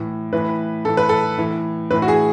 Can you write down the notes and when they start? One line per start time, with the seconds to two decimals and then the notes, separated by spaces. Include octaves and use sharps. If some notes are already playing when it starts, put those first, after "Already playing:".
Already playing: A2 E3
0.33 A2 E3 B4
0.85 A2 E3 A4
0.97 B4
1.09 A4
1.38 A2 E3
1.91 A2 B4
1.93 E3
2.02 F#4
2.08 G#4